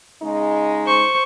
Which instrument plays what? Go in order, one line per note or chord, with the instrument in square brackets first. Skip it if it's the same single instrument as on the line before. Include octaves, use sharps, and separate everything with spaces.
[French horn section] C#3 G#3 D#4
[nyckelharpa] C5 C#6